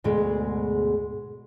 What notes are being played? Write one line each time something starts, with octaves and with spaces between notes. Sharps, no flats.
D2 G#2 B2 G#3